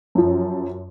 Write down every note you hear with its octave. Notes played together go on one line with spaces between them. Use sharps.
F#2 F3